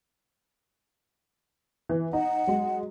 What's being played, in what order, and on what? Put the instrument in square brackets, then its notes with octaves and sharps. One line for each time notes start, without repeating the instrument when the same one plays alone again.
[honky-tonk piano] E3
[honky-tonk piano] D#4 [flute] F#5
[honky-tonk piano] F#3 G#3